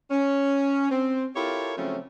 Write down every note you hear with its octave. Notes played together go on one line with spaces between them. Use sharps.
C#4
C4
E4 F4 G4 A4 A#4 C#5
C#3 F3 F#3 A3 C4 C#4